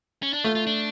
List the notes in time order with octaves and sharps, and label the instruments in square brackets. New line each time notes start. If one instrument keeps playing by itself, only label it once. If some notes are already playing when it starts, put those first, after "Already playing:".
[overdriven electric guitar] C#4
D4
[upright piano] A3 [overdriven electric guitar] F4
[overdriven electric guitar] F4
D4